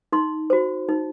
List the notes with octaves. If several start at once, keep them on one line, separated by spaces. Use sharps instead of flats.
D#4 C6
F#4 C5
D#4